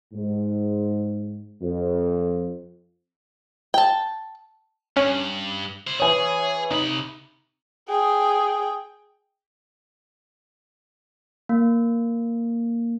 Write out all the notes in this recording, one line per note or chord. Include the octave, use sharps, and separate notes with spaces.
G#2
F2
G5 A5
G2 C#4
E4 C5
E3 G#4 C#5
C3 D#4 B5
G#4 G5
A#3